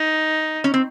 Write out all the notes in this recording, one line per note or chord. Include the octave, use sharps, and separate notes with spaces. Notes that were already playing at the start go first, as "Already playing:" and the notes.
Already playing: D#4
C#4
C4